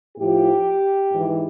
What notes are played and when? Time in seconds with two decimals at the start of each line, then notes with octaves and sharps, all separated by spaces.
0.17 A2 F3 G4
1.11 G#2 E3